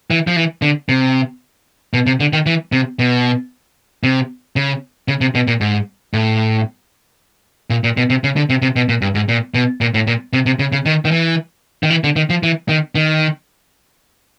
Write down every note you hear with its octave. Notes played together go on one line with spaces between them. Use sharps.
E3
F3
E3
D3
C3
B2
C3
D3
D#3
E3
C3
B2
C3
C#3
C#3
C3
B2
A#2
G#2
A2
A#2
A#2
B2
C3
C#3
D3
C3
C3
B2
A#2
G2
G#2
A#2
B2
A#2
A2
A#2
C3
C3
C#3
C#3
D#3
D#3
E3
D#3
E3
D3
D#3
F3
E3
D#3
D#3